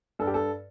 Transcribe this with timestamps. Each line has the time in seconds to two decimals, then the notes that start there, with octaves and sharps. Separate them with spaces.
0.19 G2 A4
0.27 G4
0.34 A4